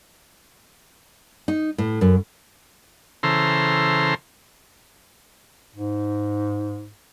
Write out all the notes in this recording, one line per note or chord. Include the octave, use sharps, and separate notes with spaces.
D#4
A2
F#2
C#3 E3 A4 C5 A#5 C6
G#2